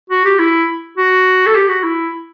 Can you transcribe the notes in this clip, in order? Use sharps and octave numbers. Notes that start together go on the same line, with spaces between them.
F#4
G4
E4
F#4
A4
G4
F#4
E4